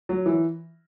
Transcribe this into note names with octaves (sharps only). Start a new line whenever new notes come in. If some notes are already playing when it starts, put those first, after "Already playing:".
F#3
E3